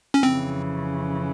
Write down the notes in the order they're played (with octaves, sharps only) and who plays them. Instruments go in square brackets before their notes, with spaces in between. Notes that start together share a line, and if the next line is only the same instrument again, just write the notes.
[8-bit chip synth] C#4
[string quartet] F2 C#3 E3 [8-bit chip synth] C4